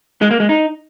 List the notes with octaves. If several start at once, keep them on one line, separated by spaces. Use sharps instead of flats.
G#3
A#3
G#3
D#4